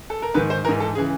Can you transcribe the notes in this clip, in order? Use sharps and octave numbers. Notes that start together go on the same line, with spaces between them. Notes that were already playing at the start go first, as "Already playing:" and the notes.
A4
A#4
G#2 D#3 B4
C5
G#2 E3 A#4
A4
C#3 E3 G#4